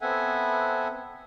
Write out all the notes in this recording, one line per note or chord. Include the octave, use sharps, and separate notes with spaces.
B3 C4 A4 E5 F#5 G#5